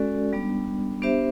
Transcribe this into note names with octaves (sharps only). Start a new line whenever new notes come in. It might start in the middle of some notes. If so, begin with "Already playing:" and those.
Already playing: G#3 C#4 F#4 A4 D5
G3 B3 D4
B3 D4 G4 C5 E5